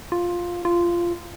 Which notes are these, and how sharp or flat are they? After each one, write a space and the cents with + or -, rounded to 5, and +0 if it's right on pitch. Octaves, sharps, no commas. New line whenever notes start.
F4 +5
F4 -15